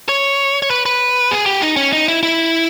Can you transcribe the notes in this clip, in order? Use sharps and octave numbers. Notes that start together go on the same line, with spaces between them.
C#5
C#5
B4
B4
G#4
G4
D#4
C#4
D#4
E4
E4